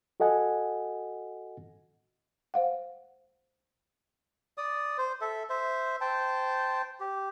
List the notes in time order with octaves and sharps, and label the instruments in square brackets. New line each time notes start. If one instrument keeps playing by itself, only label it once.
[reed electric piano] F#4 A4 D#5 F#5 G#5
[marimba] C5 F5 F#5
[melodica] D5 D#6
C5
A4 E5
C5 E5
C5 G5 A5
G4